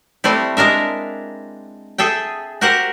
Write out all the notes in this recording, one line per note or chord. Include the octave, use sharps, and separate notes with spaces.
G3 A3 C4 E4
G#3 D4 A#4 E5
G#4 A4 E5 G5
F#4 G4 A#4 C5 F#5